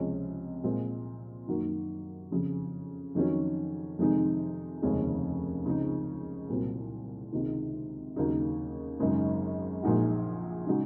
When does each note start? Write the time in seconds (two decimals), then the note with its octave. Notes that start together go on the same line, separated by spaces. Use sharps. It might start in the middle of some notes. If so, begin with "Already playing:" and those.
Already playing: C#2 C3 F3 G#3 C#4
0.64 A#2 G#3 C4 F4
1.47 F#2 D#3 A#3 D#4 F#4
2.31 F2 C#3 F3
3.15 F2 D#3 F#3 C#4
3.99 F2 C3 D#3 G#3 D#4
4.82 F1 D#2 C#3 G#3 C#4
5.66 C#2 C#3 F3 C4 D#4
6.49 C2 A#2 F#3 C4
7.32 C#2 C3 D#3
8.16 D#2 C#3 F#3 A#3 D#4
8.99 G#1 F#2 C#3 G#3 D#4
9.83 A#1 A#2 G#3 D#4 F#4
10.67 C#3 G#3 D#4 F#4